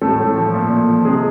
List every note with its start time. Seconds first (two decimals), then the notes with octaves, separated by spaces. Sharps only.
0.01 A2 A3 A4
0.19 A2
0.36 F3
0.54 A#2
0.70 A#2
0.88 F3
1.05 C3 G#3 G#4